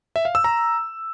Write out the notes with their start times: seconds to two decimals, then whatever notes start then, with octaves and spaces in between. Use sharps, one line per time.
0.16 E5
0.25 F5
0.35 E6
0.44 A#5